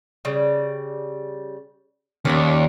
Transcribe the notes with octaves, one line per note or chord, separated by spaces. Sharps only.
C#3 G3
D#2 C#4 D4 F4